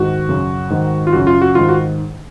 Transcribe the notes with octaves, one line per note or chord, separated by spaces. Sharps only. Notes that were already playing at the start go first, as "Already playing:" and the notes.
Already playing: G#2 D#3 F#4
F#2 C#3
G#2 D#3
F4
F#2 C#3 F#4
F4
F#4
G#2 D#3 F4
F#4